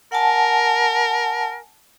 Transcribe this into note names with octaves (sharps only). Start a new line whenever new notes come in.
A#4 F#5 G#5 A5